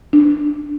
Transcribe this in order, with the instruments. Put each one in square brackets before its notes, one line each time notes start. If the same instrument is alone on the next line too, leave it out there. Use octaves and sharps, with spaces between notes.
[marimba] D4